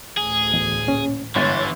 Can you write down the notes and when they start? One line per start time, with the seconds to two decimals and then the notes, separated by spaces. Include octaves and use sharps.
0.17 A1 D2 A2 G#4
0.53 E2
0.87 A#2 C#4
1.35 G1 G#2 E3 C#5 A6